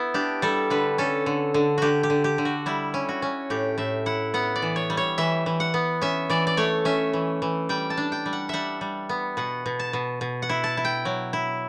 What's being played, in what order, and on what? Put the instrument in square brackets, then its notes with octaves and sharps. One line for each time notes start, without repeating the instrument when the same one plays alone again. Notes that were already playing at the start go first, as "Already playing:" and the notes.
Already playing: [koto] B3 E4
D4 G4
G3 A4
D3 B4
C#4 A4
D3
D3
D3 F#4 G4
G4
D3
G4
D3
F#4
G3 E4
C#4
F#4
C#4
A2 G4
A2 E5
E4 F#5
B3 F#5
D5
E3
C#5
G3
C#5
E3 E5
E3
F#5
B3
C#4 E5
E3 D5
D5
A3 C#5
C#4 E5
E3
E3
G3 G5
A5
D4
G5
G3
F#5
G3 E5 F#5
G3
B3
B2 F#5
B2
A5
B2
B2
F#5
E4
A5
E4
G5
F#3
E4